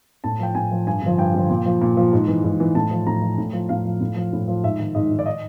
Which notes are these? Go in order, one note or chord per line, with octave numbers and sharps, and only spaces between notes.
A2 A5
F3 G5
A2 G#5
F3
G2 G#5
D3 F3
G2 G5
D3 F3
A#2
F3
A#2
F3
G#2
E3
G#2
E3
A2 A5
F3
A2 A#5
F3
A2
F3
A2 F5
F3
A2
F3
A2
F3
G#2 E5
D#3
G#2 D#5
D#3
D5
D#5